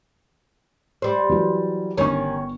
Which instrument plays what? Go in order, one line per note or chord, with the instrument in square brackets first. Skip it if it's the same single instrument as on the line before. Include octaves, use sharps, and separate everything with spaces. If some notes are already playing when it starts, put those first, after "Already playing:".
[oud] G3 C5
[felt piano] E3 F#3
[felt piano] G1 C#6 [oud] D#3 C#4